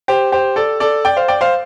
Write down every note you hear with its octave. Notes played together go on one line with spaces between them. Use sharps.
G4 C5
G4 C5
A4 D5
A4 D5
D5 G5
C5 F5
D5 G5
C5 F5